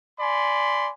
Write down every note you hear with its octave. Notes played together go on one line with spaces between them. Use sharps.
D5 G#5 B5 C6